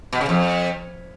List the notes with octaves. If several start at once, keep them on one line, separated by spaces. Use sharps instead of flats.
B2
C#3
F2